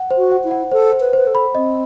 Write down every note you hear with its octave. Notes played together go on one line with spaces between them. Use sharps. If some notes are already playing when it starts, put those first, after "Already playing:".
Already playing: F#5
C5
F#4
F#5
E4
F#5
A4 C5
C5
B4
B4 C5
A4
B5
C4 D#5